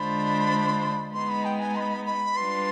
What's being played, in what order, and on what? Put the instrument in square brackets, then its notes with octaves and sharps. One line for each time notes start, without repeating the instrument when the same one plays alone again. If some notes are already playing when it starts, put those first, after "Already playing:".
Already playing: [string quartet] D3 G#3 D4 F4 C5 [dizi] B5
[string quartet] G#3 B3 D#4 [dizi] C6
[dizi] B5
G5
G#5
C6
B5
B5
[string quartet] G3 D4 F4 B4 [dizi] C6